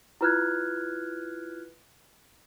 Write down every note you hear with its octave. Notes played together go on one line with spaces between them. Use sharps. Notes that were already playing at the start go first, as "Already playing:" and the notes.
E4 F4 B4 F6 F#6 G#6